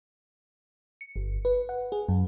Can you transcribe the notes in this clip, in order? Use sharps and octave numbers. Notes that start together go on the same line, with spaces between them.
C#7
G1
B4
F#5
G#4
F#2